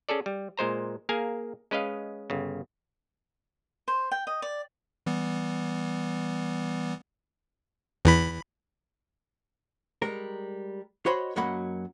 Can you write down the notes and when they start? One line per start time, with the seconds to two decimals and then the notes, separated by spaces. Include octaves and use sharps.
0.09 C#4 G#4 A4 D5
0.26 G3
0.57 A#2 G#3 C5 A#5
1.09 A#3 G#4 A#4 F5 G#5
1.71 G#3 C#4 B4 D#5 F5
2.30 G1 C#3
3.88 C5
4.11 G5
4.27 D#5
4.42 D5
5.06 E3 G3 B3
8.05 E2 E3 B5
10.02 G3 G#3 A#4
11.06 F#4 C5 C#5 D#5 B5 C6
11.36 F#2 F#3 A#3 D#5 F#5 B5